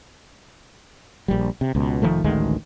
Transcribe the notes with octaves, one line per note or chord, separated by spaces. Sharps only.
A#1 G3
C3
C#2 B2
F1 D#3 F3 A3
A1 D2 D#3 G#3